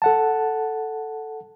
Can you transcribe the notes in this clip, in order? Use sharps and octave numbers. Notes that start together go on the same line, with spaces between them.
A4 F#5 A5